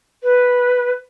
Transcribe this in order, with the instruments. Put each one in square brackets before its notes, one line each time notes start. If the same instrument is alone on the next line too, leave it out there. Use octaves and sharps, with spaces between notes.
[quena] B4